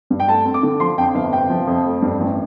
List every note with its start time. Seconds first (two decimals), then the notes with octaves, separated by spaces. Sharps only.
0.10 G2
0.20 G5
0.28 A3 A5
0.45 C4
0.54 D6
0.63 D3
0.80 F3 C6
0.97 F2 G5
1.15 G1 F5
1.33 C3 G5
1.50 F3
1.67 F2
1.85 A3
2.02 G2
2.20 A1